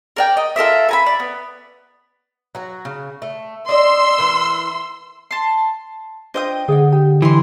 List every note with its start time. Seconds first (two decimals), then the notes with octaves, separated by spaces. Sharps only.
0.16 A#4 D5 G5
0.37 D#5
0.56 F4 A4 A#4 E5
0.89 G#5 A#5 B5
1.06 D5
1.20 B3
2.55 F#3 F#4
2.85 C#3
3.22 A3
3.69 D5 D#5 C6 E6
4.18 E3 A#4
5.31 A5 C6
6.34 D4 F4 C5 D#5 G5 D#6
6.68 D3 G#4 D5 F#5
6.92 G4
7.22 E3 D#5 C6